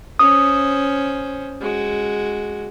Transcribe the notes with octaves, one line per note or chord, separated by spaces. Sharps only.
C#4 C5 D#6
G#3 F#4